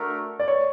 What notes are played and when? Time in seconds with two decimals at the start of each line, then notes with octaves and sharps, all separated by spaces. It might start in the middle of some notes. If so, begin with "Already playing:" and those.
Already playing: A3 D4 F#4 A#4
0.39 D5
0.48 C#5